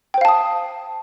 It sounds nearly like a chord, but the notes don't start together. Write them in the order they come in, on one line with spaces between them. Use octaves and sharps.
G5 C5 F5 A5 D#6